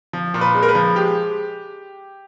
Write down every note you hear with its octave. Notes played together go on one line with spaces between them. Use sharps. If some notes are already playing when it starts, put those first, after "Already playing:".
F3
A#2
B4
G#3
A#4
B4
F3
G#3 G4